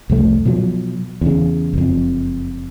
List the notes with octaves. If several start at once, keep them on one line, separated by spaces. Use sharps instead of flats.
C2 F2 A3
B2 F3 F#3
E2 C#3
F#1 F2